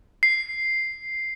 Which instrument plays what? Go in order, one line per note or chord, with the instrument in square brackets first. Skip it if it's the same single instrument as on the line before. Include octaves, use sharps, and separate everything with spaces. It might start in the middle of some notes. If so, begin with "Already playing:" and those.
[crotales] C7